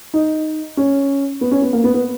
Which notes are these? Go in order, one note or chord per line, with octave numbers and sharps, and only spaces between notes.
D#4
C#4
B3
C#4
B3
A#3
B3
B3